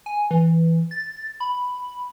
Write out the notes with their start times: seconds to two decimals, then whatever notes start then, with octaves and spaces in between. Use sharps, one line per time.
0.06 G#5
0.31 E3
0.91 A6
1.40 B5